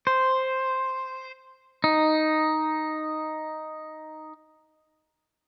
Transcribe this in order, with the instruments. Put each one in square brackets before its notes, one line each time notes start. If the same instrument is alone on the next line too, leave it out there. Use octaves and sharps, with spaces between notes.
[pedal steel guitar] C5
D#4